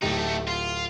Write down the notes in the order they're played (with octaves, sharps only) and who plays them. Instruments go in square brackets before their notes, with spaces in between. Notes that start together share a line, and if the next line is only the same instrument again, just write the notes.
[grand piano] D1 G4 [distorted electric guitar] A3 D#4
[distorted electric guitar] F4